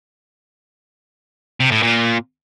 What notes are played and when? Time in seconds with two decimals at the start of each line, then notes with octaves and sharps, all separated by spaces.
1.60 C3
1.71 A2
1.83 A#2